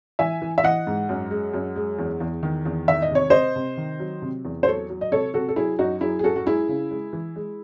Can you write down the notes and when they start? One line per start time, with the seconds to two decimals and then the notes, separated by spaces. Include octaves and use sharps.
0.19 E3 E5 G#5
0.42 E3
0.58 E5
0.64 E3 D#5 F#5
0.87 G#2
1.09 F#2
1.31 G#3
1.54 F#2
1.76 G#3
1.99 E2
2.20 E2
2.43 D#3
2.66 E2
2.88 D#3 E5
3.02 D#5
3.11 C3 C#5
3.30 C3 C5 D#5
3.56 C3
3.77 D#3
4.00 F#3
4.22 C3
4.45 E2
4.63 C5
4.67 F#3 A4 C#5
4.90 F#3
5.01 D#5
5.12 C3 A4 C#5
5.34 C3 F#4 A4
5.48 A4
5.56 F#3 E4 G#4
5.79 F#2 D#4 F#4
6.01 F#3 E4 G#4
6.19 G#4
6.24 F#2 F#4 A4
6.36 F#4
6.46 G#3 E4 G#4
6.68 C#3
6.91 G#3
7.13 E3
7.36 G#3